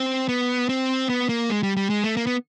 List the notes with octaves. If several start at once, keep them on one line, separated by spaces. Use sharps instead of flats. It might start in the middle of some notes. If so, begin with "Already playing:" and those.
Already playing: C4
B3
C4
B3
A#3
G#3
G3
G3
G#3
A3
A#3
B3